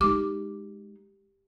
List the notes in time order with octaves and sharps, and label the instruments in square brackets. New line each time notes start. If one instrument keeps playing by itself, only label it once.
[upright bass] G#3 D#4 [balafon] G4 D6